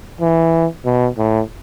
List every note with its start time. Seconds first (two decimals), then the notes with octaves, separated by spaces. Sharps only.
0.21 E3
0.85 B2
1.18 A2